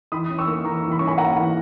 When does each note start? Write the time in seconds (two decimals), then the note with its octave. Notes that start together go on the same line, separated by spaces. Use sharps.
0.12 E3 B5 D#6
0.30 C#4
0.38 C#6 E6
0.47 A#3
0.65 E3 A#5 C#6
0.83 E3
0.91 B5
0.99 C#4 C#6
1.07 G#5 B5
1.18 A#3 F#5 A#5
1.36 E3